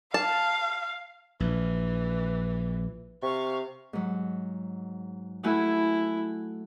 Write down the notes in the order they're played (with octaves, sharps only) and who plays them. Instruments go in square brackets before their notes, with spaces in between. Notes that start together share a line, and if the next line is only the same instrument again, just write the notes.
[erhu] F5 [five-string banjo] A5
[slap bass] A#1 [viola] E3
[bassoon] C3 [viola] F5 C#6
[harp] G#2 F#3
[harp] A3 F#4 G#5 [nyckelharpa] E4